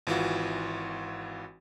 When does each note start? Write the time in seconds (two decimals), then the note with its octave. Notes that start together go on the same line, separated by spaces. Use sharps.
0.07 G#1 E3 F4 F#4